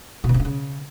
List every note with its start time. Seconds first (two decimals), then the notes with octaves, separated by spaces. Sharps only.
0.24 B2
0.29 D#3
0.34 C3
0.40 D3
0.45 C#3